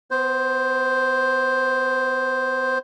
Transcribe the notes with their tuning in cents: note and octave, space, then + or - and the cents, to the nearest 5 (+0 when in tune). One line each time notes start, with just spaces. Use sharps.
B3 +35 C5 +0